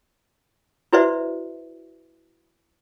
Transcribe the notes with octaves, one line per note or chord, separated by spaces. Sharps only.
E4 F#4 B4 C5 D5 E5